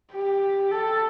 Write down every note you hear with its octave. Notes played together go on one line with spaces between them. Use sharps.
G4
A4